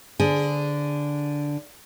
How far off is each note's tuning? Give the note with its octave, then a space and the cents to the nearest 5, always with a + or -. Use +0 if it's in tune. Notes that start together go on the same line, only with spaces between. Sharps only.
D3 -5 G#4 +0 C5 -30